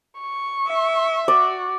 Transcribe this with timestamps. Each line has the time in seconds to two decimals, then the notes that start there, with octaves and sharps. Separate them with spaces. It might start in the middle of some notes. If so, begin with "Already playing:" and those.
0.20 C#6
0.67 E5
1.28 F#4 D5